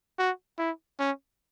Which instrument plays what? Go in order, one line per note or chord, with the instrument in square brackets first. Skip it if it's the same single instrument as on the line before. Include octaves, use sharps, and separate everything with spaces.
[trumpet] F#4
E4
C#4